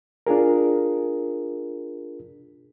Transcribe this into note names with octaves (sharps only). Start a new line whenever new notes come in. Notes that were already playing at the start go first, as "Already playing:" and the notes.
D4 F4 G#4 A#4